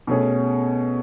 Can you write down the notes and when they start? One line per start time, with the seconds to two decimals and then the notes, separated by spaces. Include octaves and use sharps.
0.07 B2 A3 C#4 G#4